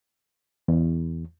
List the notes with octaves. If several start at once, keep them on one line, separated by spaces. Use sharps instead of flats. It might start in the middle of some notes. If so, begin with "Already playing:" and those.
E2